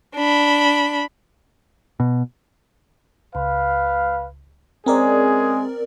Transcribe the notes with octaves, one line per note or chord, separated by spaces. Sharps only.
D4 B5
B2
C#2 B4 F5
G#3 C4 C#4 G#4 A#4 D5